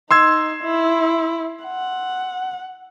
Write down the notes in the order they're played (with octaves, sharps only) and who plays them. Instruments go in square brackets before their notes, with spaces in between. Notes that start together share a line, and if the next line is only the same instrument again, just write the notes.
[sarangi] D#4 [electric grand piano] C6 E6 G#6
[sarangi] E4
F#5